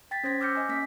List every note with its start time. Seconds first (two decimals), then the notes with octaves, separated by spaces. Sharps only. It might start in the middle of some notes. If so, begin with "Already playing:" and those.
0.11 G5 A6 B6
0.24 C#4 C5 G#6 A#6 B6
0.41 D6 E6 F6 G6 A#6 C#7
0.55 D#5 G#5
0.69 A#3 C#4 B6